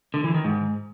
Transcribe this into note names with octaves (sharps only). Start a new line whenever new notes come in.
D3
E3
D#3
G#2